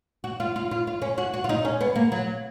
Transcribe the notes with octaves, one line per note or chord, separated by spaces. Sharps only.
F#4
F4
F4
F4
F4
C#4
F#4
F#4
F4
D#4
C#4
B3
A#3
F#3